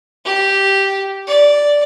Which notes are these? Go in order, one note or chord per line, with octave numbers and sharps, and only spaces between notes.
G4
D5